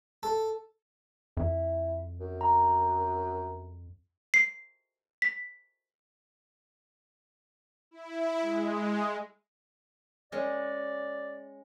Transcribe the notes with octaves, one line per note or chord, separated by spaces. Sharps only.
A4
F2 E4
F#2
A#5
C7
B6
E4
G#3
G#3 C#4 D5